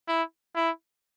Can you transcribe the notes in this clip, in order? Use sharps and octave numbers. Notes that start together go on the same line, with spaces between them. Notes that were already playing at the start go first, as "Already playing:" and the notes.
E4
E4